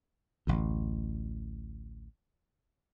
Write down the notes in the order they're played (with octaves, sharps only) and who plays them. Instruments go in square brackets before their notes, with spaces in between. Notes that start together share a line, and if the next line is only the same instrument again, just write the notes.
[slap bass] A1 D2